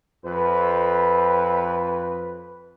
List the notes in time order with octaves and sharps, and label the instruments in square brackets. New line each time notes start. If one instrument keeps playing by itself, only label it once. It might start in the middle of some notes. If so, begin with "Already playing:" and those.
[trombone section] F2 B4